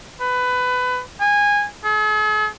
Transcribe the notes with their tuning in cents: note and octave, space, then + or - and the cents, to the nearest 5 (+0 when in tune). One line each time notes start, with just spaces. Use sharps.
B4 +20
G#5 -20
G#4 +45